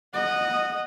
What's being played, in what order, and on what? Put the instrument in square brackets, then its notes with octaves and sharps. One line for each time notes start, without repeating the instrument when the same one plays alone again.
[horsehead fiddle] D#5 [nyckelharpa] F#5